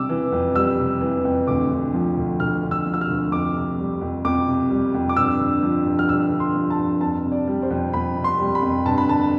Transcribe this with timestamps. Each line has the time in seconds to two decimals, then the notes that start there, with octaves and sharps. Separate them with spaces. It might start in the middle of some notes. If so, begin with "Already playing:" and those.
Already playing: C3 G3 D6 E6
0.09 E3
0.32 F2
0.55 G3 E6
0.78 C3
1.01 E3
1.24 F2
1.47 D2 D6
1.71 D3
1.94 F3
2.17 D2
2.40 D2 F6
2.63 D3
2.71 E6
2.86 F3
2.94 E6
3.01 F6
3.10 D2
3.32 F2 D6
3.56 C3
3.79 G3
4.01 F2
4.25 F2 D6
4.47 C3
4.71 G3
4.94 F2
5.09 D6
5.16 G2 E6
5.40 D3
5.62 F3
5.86 G2
5.99 F6
6.09 G2 E6
6.32 D3
6.40 C6
6.55 F3
6.70 A5
6.79 G2
7.01 F2 A5
7.25 C3
7.32 D5
7.48 G3
7.62 C5
7.70 F2
7.93 F2 B5
8.16 C3
8.24 C6
8.40 G3
8.55 B5
8.62 F2
8.86 G2 A5
8.98 B5
9.09 D3 A5